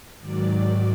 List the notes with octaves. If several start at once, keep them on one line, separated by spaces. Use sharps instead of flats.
G#2 D#3 F#3 D5